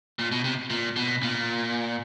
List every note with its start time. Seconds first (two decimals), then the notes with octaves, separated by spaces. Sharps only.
0.19 A#2
0.32 B2
0.44 C3
0.70 A#2
0.96 B2
1.23 A#2